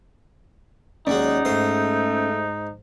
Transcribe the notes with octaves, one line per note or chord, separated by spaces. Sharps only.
D#2 F#3 G#3 C#4 D#4 G#4 D5 F#5
G#2 A3 C5